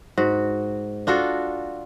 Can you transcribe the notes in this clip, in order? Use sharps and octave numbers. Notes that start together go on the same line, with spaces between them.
G#2 F#4
D4 F4 F#4 A4